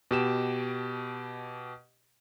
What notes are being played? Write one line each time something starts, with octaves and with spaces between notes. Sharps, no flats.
B2 G4 E7